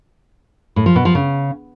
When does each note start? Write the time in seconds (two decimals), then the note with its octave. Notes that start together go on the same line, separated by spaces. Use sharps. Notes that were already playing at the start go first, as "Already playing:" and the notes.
0.76 A2
0.86 F3
0.96 B2
1.05 F3
1.15 C#3